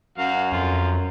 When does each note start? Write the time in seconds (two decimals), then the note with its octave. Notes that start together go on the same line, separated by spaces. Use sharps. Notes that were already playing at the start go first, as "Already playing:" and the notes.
0.18 F#2 F#4 F5
0.52 F2 F4